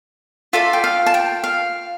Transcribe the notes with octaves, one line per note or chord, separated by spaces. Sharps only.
F4 A4 D5 E5
G5
F5
A5
G5
F5